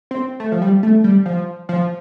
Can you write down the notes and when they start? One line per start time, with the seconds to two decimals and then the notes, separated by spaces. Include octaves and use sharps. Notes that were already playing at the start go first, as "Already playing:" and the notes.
0.11 C4
0.40 A3
0.52 F3
0.62 G3
0.83 A3
1.04 G3
1.26 F3
1.69 F3